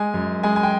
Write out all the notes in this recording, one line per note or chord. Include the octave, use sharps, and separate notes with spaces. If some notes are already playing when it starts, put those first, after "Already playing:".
Already playing: G#3 G#5
F#2
G#3 G#5
G#5
G5